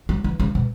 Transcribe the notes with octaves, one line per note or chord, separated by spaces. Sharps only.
F#3
E3
C#3
B2